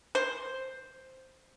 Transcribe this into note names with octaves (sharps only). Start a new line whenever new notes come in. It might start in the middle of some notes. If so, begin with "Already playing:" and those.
C5